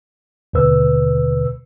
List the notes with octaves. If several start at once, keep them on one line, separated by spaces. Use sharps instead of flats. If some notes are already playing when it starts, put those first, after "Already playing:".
D#2 B2 D3 B4 E6